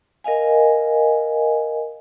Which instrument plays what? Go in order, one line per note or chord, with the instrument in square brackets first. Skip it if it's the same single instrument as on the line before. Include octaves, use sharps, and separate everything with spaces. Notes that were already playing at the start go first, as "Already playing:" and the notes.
[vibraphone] A#4 D#5 F5 G#5